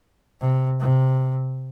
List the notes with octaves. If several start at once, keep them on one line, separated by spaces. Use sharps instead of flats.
C3
C3